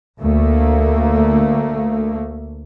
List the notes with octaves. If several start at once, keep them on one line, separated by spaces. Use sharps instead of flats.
D2 A3 A#3